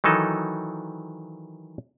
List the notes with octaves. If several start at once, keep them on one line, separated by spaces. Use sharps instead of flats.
D#3 E3 F#3 D#4 A4